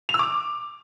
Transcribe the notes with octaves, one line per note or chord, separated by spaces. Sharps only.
F7
E6
D6